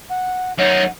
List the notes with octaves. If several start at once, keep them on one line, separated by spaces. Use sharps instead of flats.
F#5
F#2 D#4 C#5 F#5